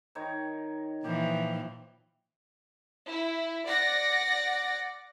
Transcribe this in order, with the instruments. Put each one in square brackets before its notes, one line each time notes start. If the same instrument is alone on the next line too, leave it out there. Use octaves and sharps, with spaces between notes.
[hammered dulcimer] D#3 D#4 C#5
[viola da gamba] A#2 E3 F3 [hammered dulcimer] G4
[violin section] E4
D5 F#5 A#6